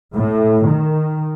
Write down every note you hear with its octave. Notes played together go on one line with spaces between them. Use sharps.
A2
D#3